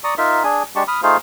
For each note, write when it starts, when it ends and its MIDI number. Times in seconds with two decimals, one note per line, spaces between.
0.04 0.14 74
0.04 0.14 82
0.04 0.14 85
0.04 0.14 87
0.18 0.43 63
0.18 0.43 65
0.18 0.43 70
0.18 0.43 76
0.44 0.63 62
0.44 0.63 68
0.44 0.63 80
0.76 0.83 56
0.76 0.83 62
0.76 0.83 67
0.76 0.83 81
0.76 0.83 85
0.88 1.01 83
0.88 1.01 87
0.88 1.01 89
1.03 1.17 57
1.03 1.17 63
1.03 1.17 65
1.03 1.17 68
1.03 1.17 72
1.03 1.17 77